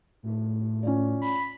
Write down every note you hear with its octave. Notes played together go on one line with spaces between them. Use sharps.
A2
C#4 F4 D5
B5